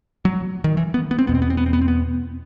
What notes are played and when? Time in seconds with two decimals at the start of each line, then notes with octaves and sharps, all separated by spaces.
0.25 F#3
0.64 D#3
0.77 E3
0.94 B3
1.11 B3
1.19 C4
1.27 E2 B2 B3
1.35 C4
1.42 B3
1.50 C4
1.57 B3
1.66 C4
1.73 B3
1.81 C4
1.88 B3